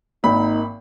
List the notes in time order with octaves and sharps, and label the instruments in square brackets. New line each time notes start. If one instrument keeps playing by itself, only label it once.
[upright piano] G#1 D#3 [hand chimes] A#3 [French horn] D#4 [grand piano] B5